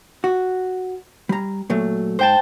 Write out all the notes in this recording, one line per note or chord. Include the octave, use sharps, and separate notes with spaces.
F#4
G3 A#5
A#2 F#3 A3
G#2 C5 G5 A5